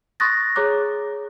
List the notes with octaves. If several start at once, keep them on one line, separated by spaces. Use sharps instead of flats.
C6 C#6 D#6 F#6 A6 A#6
G#4 C#5 A#5 D6 F#6